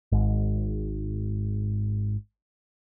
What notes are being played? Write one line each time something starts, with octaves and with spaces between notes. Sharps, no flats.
G#1 G#2